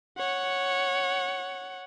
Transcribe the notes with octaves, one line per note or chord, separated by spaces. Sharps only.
C#5 F#5